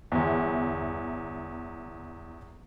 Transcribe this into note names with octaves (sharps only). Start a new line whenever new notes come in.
G1 E2